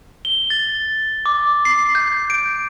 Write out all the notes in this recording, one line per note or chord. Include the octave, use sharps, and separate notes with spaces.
G7
A6
D6
C7
G6
D7